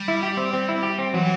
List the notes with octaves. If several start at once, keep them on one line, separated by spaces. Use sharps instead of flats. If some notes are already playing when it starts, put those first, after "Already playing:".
Already playing: G3
E4
G4
C4
C4
E4
G4
C4
E3 F#3